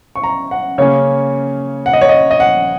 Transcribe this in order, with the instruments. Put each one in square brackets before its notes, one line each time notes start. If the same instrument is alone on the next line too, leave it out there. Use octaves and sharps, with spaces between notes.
[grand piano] C#6
A#5
F#5
C#3 A#3 C#4 C#5
F#5
D#5
C#5
D#5
D#5
F#5